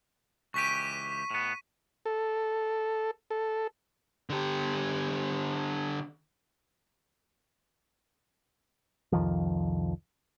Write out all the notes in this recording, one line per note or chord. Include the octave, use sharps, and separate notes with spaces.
C#2 E3 G4 C#6 B6 D#7
A2 B3
A4
A4
D3 G4
C2 F2 D#3 F3